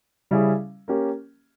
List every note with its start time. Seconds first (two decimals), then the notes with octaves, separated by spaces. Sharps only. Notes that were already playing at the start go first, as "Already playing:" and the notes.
0.31 C#3 G3 C#4 E4 G#4
0.88 A#3 C#4 G4